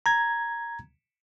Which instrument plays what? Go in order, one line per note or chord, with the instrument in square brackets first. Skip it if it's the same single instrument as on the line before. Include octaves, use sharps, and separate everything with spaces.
[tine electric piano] A#5 G#6